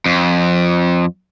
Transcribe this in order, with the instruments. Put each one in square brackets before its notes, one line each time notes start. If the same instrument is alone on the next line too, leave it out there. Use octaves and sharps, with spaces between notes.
[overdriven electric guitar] F2